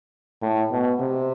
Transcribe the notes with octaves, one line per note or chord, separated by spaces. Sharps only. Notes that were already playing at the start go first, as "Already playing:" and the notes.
A2
B2
C3